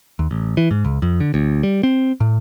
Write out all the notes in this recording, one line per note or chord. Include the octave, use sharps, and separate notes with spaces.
D#2
A1
E3
G#2
C#2
F2
D3
D2
G3
C4
A2